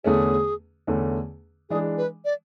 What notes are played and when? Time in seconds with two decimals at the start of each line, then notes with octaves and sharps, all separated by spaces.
0.04 E2 D3 A3 C#4 G#4
0.87 E2 D3 A3 C#4
1.70 E3 G#3 D4 G#4
1.98 B4
2.25 D5